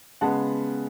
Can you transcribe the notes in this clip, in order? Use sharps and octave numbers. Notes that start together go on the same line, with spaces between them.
C#3 G#3 B3 F#5 A5